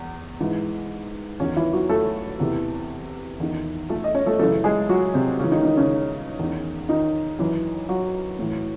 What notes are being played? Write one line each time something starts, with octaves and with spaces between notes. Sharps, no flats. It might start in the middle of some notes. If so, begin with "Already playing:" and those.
Already playing: E2
G#2 E3
E2 D#3 C#4 C#5
E3 E4
F#3 F#4
A3 A4
E2 C3 E3
E2 D#3
A3 A4
D#5
C#4 C#5
A3 A4
F#2 C#3 E3 A3 A4
G#3 G#4
F#3 F#4
C3 C4
G#2 C#3 E3 C#4
D#3 D#4
D#3 D#4
C#3 C#4
E2 D#3
D#3 D#4
F#2 E3
F#3 F#4
A2 E3